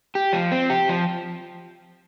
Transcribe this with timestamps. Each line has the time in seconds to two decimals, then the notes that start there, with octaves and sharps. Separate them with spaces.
0.15 G4
0.33 F3
0.52 C4
0.70 G4
0.89 F3